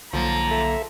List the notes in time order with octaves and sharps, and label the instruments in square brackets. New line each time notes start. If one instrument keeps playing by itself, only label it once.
[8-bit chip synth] B1 D3 A#3 [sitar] F3 [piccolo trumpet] A#5
[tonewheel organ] A4 E5